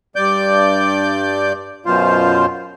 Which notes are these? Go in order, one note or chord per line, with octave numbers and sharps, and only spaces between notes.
G2 D5 D6 G6
F#2 B2 F4 C5